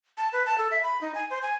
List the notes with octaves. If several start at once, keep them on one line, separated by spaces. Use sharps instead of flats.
A5
B4
A5
A4
E5
B5
D#4
G#5
C5
G#5